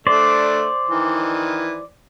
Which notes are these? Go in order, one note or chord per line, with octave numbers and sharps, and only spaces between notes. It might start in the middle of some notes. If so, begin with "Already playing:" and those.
A3 D4 C5 D5
D#3 E3